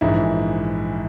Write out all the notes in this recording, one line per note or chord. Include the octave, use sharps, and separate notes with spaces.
A#1 G#2 E3 E4